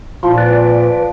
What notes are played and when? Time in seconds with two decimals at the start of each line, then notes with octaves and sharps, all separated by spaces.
0.23 A#2 F3 E4 F4
0.38 B4 D5